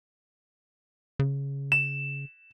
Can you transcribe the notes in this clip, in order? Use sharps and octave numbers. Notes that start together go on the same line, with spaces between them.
C#3
E7